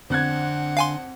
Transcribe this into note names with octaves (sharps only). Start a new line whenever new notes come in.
F2 D3 C4 F#5 F#6 G#6
F5 G#5 C6